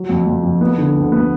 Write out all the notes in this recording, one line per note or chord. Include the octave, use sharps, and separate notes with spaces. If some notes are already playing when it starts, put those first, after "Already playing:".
Already playing: F#3
F2
F2
F2
B3
D3
D2
B3